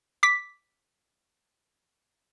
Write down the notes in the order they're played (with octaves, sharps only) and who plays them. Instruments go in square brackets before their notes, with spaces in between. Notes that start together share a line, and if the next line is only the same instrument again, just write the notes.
[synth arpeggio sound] D6 B6